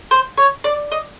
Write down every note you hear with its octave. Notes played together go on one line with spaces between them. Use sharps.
C5
C#5
D5
D#5